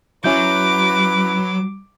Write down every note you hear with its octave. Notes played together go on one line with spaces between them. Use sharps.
F#3 C#4 E4 B4 D6 G6